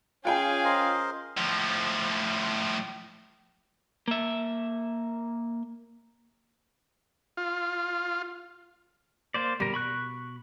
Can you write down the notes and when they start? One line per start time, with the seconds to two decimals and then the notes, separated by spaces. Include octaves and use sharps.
0.25 C#4 F4 G#4 F5 G5 G#5
0.65 A#4 C5 D#5
1.37 A2 F3
4.08 A#3 E5
7.37 F4
9.34 A#3 C5 D5
9.60 B2 G3 A#4
9.74 B5 C#6 F#6